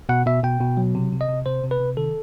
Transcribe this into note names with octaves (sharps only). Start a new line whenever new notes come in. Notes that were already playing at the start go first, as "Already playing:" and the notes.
B2 F#5
B2 E5
B2 G5
B2
F#3
C3
C3
D#5
C3
C3 C5
C3
B4
C3
D#3 A4